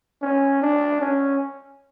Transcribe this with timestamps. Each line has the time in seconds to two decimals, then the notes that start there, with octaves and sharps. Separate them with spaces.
0.22 C#4
0.62 D4
1.01 C#4